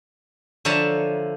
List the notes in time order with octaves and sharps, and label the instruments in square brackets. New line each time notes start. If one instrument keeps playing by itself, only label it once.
[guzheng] D3 F3 C#5 E5 A5 A#5